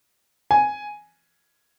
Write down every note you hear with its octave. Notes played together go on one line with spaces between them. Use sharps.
G#5